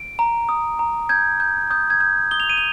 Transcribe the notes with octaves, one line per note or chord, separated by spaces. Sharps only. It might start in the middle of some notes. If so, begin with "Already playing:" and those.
Already playing: D7
A#5
D#6
A#5
G6 G#6
G6
D#6 G6
G#6
G6
D#6 G7
F7
D#7
F7